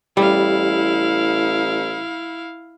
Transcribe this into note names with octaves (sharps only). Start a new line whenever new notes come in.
A1 G3 E4 F5